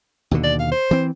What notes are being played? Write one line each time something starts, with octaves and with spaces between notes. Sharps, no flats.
D#2 B2 D3
D5
F5
C5
E3 C4